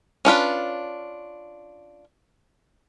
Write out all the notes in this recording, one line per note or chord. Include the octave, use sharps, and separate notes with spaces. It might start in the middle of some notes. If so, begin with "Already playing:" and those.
C#4 D4 F4 B4